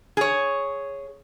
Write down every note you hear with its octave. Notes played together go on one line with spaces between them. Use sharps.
G#4 C#5